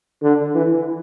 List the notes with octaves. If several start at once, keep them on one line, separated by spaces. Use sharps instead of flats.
D3
E3